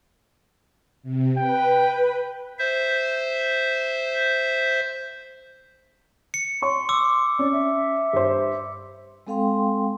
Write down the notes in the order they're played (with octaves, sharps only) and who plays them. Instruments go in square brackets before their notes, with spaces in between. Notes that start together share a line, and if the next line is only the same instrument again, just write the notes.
[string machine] C3
[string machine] B4 [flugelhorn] G5
[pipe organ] C5 E5
[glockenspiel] C#7
[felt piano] C#5 C#6 [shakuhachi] C6
[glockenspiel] D6 E6
[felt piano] C#4 [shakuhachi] D5
[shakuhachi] E5
[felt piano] G2 C5
[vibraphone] G#3 C4 A4 F5 G5 C6